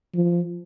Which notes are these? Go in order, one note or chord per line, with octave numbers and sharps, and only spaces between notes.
F3